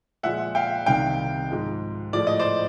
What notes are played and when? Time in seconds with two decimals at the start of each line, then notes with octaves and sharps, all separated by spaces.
0.23 A#2 F3 G#3 E5 F#5
0.55 F5 G5
0.86 C2 C3 D#3 G3 F5 G5
1.50 G#2 F3 G#3
2.13 A2 F3 G#3 D5
2.27 D#5
2.40 C5 D5